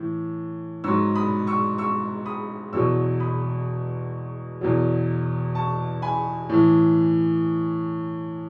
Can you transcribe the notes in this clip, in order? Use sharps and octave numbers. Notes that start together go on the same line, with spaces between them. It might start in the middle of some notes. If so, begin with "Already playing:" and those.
Already playing: A2 E3
G#2 F#3 C#6 E6
B5 D#6
C#6 E6
C#6 E6
B5 D#6
E2 B2 F#3 C#6 E6
B5 D#6
E2 B2 F#3
A5 C#6
G#5 B5
A2 E3